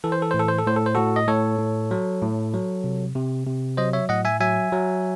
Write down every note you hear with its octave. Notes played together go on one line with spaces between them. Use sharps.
E3 A4
C5
A4
A2 C5
A4
C5
A4
A2 C5
A4
C5
A2 F#4 A4
D#5
A2 A4 C#5
A2
F#3
A2
F#3
C3
C3
C3
F#3 C5 D#5
C#5 E5
A2 D#5 F#5
E5 G#5
F#3 E5 G#5
F#3